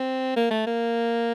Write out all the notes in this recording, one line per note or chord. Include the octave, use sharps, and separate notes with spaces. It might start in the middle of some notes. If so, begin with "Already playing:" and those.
Already playing: C4
A#3
A3
A#3